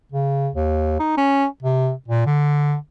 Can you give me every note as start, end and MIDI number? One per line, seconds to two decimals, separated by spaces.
0.12 0.49 49
0.55 0.99 39
1.00 1.13 63
1.18 1.46 61
1.63 1.92 48
2.08 2.25 46
2.26 2.75 50